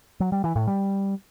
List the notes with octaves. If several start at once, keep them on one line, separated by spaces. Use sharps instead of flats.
F#3
G3
E3
A2
G3